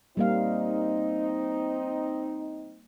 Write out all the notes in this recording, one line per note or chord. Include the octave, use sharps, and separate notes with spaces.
G3 A#3 C4 D#4 F5